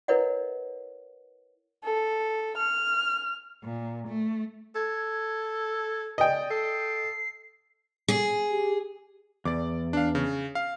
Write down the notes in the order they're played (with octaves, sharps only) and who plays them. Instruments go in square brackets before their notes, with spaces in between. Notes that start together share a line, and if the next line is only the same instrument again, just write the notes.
[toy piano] E4 A#4 B4 C#5 D#5 F#5
[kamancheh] A4
F6
[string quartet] A#2
A3
[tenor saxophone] A4 [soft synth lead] G#6
[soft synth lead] D5 [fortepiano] D#5 G5
[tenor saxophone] A4 [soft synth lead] C7
[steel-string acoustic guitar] G#4
[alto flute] G4
[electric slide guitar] E2 [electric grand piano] D5 D6
[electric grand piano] D4 F5
C#3
F5